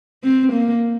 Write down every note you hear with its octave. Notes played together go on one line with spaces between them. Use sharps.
C4
A#3